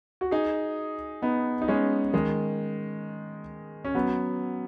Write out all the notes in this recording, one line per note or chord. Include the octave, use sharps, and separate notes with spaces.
F#4
D#4 G#4
B3 D#4
D#4
G#3 C#4
D#3 G#3
C#4
F#3 B3